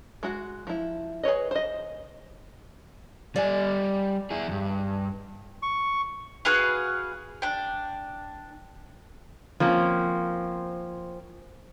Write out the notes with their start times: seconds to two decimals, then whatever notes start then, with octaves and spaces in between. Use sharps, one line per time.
0.23 G#3 F#4
0.67 F3 E4
1.23 G#4 B4 C#5 D#5
1.51 C5 D#5
3.36 G3 D5 D#5 G#5
4.30 E4 G#4
4.48 E2 G2
5.63 C#6
6.45 F#4 G#4 B4 F5
7.42 D4 G5
9.60 F3 A#3 C4 C#4